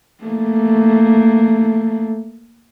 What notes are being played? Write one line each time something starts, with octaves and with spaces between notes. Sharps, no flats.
A3 A#3